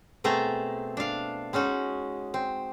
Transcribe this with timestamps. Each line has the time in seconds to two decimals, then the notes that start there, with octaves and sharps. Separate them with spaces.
0.24 B2 A3 C4 G#4 A5 A#5
0.97 D4 F5
1.53 G#3 C#4 D#4 F#4
2.34 C4